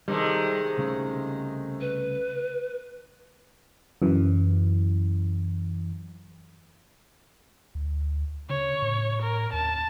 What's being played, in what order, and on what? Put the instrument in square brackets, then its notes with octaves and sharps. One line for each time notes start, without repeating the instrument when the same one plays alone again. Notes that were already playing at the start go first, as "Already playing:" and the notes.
[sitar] C3 D#3 G#3 [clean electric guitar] G3 D#4 A4
[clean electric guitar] C2 C#3 A3
[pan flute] B4
[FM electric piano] F#2 E3
[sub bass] D2
[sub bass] C#3 [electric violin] C#5
[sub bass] A2
[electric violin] A#4
[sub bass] D#2 [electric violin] A5